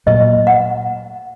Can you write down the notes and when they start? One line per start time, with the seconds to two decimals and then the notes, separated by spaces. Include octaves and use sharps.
0.06 A#2 F#3 A3 D#5
0.47 F#5